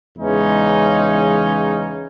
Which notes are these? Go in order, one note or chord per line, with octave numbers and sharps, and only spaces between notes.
E2 C#3 E3 G#3 C#4 D#4